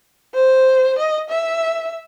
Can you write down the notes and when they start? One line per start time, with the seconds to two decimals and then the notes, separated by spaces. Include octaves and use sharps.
0.34 C5
0.99 D#5
1.30 E5